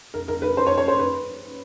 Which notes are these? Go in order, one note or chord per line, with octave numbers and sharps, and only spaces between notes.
A#4
A#4
B4
C5
C#5
C#5
C5
B4